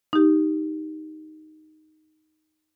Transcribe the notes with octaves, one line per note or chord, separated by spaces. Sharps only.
D#4 G4